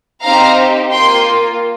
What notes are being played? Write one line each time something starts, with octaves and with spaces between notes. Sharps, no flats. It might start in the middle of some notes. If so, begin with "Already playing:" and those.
C4 D#4 G4 F5 A#5
A#3 F4 G5 C6